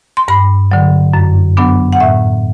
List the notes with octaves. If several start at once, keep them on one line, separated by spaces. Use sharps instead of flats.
C6
G2 B5
D3 F#3
F#2
F#3 B3 D4
F#5
A2 E5